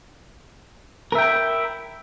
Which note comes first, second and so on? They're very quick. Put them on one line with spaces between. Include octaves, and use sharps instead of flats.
A#4 E5 G5 E4